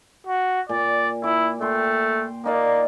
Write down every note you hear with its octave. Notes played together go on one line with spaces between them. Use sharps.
F#4
A#2 D5
E4 D6
A3 G5 C6
A#3 D#4 D5